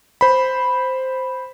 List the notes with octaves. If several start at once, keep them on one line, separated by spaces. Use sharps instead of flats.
C5 B5